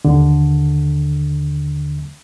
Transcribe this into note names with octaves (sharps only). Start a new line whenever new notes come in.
D#2 D3